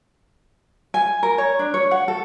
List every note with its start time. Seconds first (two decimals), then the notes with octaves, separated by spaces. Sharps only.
0.94 G#5
1.23 A#4
1.38 C#5
1.59 D4
1.74 C#5
1.91 F#5
2.08 A4